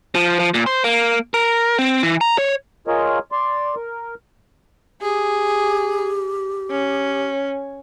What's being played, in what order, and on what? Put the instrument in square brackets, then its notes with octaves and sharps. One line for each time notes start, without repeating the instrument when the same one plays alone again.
[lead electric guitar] F3
F3
A#2
C5
A#3
A#4
C4
E3
A#5
C#5
[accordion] F4 G#4 A#4 C#5 D#5
D5 C6
A#4
[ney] G4 [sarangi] G#4
[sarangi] C#4